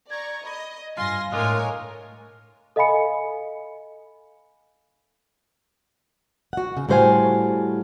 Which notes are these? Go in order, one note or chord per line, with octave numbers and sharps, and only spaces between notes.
D5 A#5 C#6 G#6
D#5 B5
G2 F4 F5 G#5 C6 A#6
A2 G#3 D4 F4 A#4 C#5 G#5
A4 D#5 F5 G#5 B5 C#7
F#4 F#5
C#3
A2 G3 F#4 C5 F5 G#5